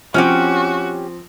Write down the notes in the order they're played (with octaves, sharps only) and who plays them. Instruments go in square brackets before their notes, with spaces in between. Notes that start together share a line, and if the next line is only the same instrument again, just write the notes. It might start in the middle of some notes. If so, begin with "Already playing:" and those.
[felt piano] F3 C4 [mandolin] C#4 E4 G4 [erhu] F#4